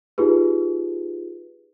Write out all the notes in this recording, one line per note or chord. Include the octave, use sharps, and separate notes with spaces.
D#4 F4 G4 G#4 B4